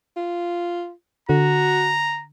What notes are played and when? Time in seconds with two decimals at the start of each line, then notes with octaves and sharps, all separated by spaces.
0.17 F4
1.29 D3 F#4 A#5